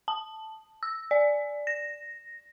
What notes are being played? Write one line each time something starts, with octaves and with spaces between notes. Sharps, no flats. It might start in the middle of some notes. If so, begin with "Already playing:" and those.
A5
E6
D5
A#6